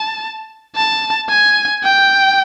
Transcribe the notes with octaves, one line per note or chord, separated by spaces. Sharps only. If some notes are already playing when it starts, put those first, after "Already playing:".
Already playing: A5
A5
G#5
G5